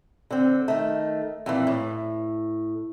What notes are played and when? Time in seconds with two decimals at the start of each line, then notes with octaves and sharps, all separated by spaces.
0.31 D3 C4
0.68 D#3 A3
1.46 F2 A#2 E3
1.67 A2